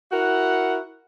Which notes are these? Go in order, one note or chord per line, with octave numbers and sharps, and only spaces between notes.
E4 F#4 A#4 F#5